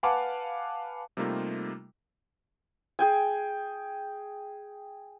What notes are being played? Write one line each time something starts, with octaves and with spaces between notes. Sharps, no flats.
B4 F5 F#5 G#5 A5 D6
C3 G3 A3 A#3 D#4 F4
G#4 G5 G#5